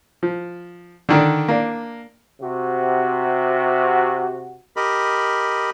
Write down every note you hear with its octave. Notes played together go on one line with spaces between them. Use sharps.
F3
D3 D#3 D4
A#3 D4
C3 F#4
G4 A#4 D#5 B5